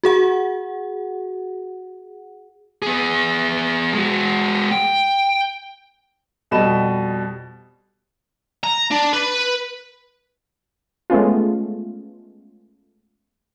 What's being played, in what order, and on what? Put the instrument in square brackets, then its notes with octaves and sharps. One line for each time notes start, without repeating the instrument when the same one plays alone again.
[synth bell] F#4 G#4 F#5
[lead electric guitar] B3 G#4
G#3 F#4
G5
[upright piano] F2 B2 G3 D#5 B5 E7
[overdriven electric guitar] A#5
D4
B4
[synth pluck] G#3 A3 B3 C#4 F4